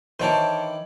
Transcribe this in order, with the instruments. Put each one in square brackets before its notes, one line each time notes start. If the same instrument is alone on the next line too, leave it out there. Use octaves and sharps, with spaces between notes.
[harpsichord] D#3 E3 D4 [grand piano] C5 C#5 A5